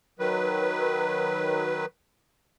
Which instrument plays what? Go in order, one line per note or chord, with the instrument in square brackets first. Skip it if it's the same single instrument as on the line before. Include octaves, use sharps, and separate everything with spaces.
[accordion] D#3 F#3 B4